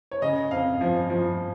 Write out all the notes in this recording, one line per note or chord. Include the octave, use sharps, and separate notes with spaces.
C#5
C#3 D#5
F2 F5
F3
F3